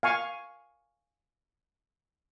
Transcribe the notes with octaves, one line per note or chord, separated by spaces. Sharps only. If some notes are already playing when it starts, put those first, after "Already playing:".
F5 G#5 C#6